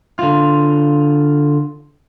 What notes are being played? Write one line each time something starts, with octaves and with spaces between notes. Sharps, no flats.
D3 F4